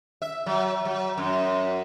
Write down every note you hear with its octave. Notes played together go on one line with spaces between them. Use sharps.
E5
F#3
F#3
F#2